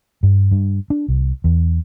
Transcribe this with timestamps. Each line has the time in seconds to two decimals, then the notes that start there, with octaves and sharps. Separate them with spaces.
0.23 G2
0.51 G2
0.90 D4
1.08 C2
1.44 E2